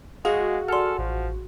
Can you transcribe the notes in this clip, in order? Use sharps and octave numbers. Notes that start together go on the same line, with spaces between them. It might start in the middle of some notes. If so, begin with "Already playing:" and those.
G#3 F#4 G#4 F5
A4 D5 F#5 G#5 C6 F6
A1 F3